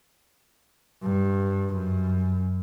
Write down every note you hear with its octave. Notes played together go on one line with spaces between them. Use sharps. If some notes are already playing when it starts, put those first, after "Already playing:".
G2
F#2